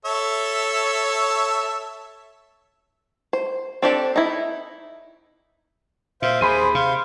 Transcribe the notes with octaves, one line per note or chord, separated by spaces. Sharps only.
A4 C#5 E5
C5
C4 D4 G4 A4
D#4 E4
A#2 C5 E5 F5
D#2 G#4 C5 B5 C6 D#7
C3 F5